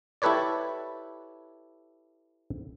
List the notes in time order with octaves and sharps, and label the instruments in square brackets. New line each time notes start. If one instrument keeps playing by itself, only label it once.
[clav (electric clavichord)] E4 G4 A4 B4 C#5 D5